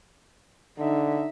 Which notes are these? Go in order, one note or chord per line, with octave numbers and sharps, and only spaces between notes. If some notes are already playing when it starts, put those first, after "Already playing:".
D3 D#4 E5